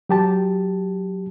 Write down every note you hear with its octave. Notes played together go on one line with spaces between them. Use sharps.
F#3 G4 A5